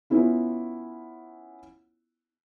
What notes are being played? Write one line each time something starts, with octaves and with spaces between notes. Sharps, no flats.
B3 C#4 E4 F4